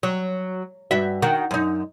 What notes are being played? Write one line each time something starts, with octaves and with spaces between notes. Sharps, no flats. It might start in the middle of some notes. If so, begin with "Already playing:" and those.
F#3
G2 F#4 E5
D#3 F#4
F#2 D#4